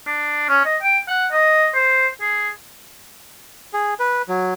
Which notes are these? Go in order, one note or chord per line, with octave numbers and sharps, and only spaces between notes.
D4
C#4
D#5
G5
F#5
D#5
C5
G#4
G#4
B4
F#3